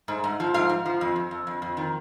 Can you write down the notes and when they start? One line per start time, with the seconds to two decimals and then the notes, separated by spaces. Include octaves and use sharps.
0.08 G#2
0.24 G#2
0.40 F3
0.54 G#2 F5
0.69 G#2
0.86 F3
1.01 F2
1.16 F2
1.31 F2
1.47 F2
1.62 F2
1.77 D#3